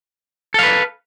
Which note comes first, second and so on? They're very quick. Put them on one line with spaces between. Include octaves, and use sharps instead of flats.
A4 F5 B4